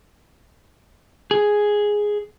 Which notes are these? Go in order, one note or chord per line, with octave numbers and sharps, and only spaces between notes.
G#4